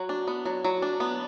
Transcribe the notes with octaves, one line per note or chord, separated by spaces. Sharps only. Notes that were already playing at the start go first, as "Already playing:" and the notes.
Already playing: F#3 F#4
D4
B3
F#3
F#3
D4
B3